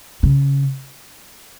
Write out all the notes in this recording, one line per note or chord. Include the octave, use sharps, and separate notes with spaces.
C#3